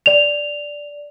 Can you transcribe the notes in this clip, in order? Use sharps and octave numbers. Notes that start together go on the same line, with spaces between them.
D5 F7